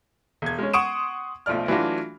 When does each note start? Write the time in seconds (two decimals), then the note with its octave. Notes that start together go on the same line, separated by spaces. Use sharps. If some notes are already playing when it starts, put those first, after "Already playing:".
0.42 E1 G#6
0.59 G#3 C#4
0.73 F#5 C6 C#6 D#6 D7 E7
1.46 B1 F3 A3 D5 F6
1.68 E3 F#3 A3 D4 F4 F#4